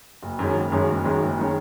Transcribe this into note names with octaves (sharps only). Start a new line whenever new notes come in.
F#1
F#2 D#3 G#3 C#4
F#1
F#2 D#3 G#3 C#4
F#1
F#2 D#3 G#3 C#4
F#1
D#3 G#3 C#4